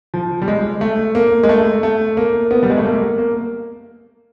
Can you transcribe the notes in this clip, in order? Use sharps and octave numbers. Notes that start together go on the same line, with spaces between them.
F3
G3
G#3
A3
A#3
G#3
A3
A3
A#3
B3
G3
G#3
A3
A#3
A#3